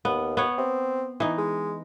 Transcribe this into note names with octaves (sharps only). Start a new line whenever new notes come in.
D#2 B3
B3 C#5
C4
E3 D#4
G#3